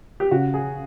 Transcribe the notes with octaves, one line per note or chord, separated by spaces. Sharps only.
G4
C#3 F#4
G#4